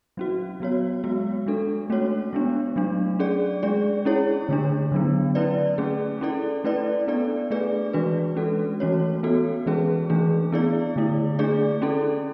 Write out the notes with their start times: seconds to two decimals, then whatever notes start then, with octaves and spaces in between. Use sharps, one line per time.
0.17 F#3 C#4 F#4
0.60 F#3 B3 F#4 C#5
1.04 G#3 B3 F#4
1.46 G#3 D4 A4
1.90 A3 C#4 F#4 C#5
2.33 G#3 B3 D4
2.76 F#3 A3 D4
3.19 C#4 G#4 D5
3.63 G#3 D4 G#4 D5
4.05 C#4 E4 G#4 C#5
4.49 D3 A3 D4
4.92 D3 F#3 B3
5.35 C#4 E4 B4 D5
5.78 A3 C#4 G#4
6.21 C#4 E4 A4 D5
6.64 A3 C#4 E4 B4 D5
7.08 B3 D4 A4 D5
7.51 A3 D4 G#4 B4 D5
7.93 E3 G#3 D4 F#4 B4
8.37 G#3 C#4 F#4 A4
8.80 E3 A3 C#4 F#4 C#5
9.23 B3 F#4 A4
9.66 E3 G#3 C#4 G#4 B4
10.10 E3 A3 D4 G#4
10.52 B3 E4 G#4 D5
10.96 D3 A3 E4
11.39 A3 D4 G#4 D5
11.82 C#4 E4 A4